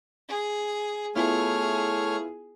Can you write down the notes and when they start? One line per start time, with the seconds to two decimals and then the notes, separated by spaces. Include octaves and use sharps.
0.29 G#4
1.16 A3 B3 E4 F4 G#4 C#5 F6